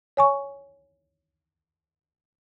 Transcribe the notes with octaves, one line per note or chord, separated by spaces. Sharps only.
C#5 G#5 C#6